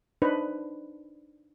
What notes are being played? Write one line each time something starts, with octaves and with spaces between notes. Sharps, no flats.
D4 D#4 B4 C5